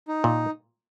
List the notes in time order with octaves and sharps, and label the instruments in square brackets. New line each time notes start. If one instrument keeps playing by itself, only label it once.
[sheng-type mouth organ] D#4
[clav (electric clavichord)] A#2